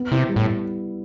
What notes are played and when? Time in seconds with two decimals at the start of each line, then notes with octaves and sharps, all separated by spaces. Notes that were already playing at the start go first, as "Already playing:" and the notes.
Already playing: B3
0.12 C3 E4
0.29 G3
0.36 A2